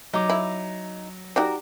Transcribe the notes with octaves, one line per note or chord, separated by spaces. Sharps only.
F#3 D#4 D6
E4
D#4 F#4 G4 A#4 D5